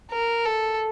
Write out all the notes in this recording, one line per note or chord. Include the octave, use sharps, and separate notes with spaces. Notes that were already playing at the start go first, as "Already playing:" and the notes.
A#4
A4